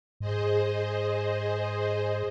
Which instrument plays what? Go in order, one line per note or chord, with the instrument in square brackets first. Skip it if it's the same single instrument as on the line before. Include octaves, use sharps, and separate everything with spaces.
[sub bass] G#2 [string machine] G#4 C5 D#5